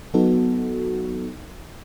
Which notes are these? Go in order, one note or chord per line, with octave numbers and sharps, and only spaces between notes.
F#3 B3 D#4 F#4 A4